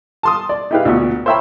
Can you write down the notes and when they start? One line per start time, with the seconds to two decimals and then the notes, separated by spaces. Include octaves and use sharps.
0.23 A5 C6 D#6
0.49 D5
0.71 D#4 E4 G4 G#4 B4 F5
0.85 D2 A#2 B3
1.26 C5 C#5 E5 G5 A#5 B5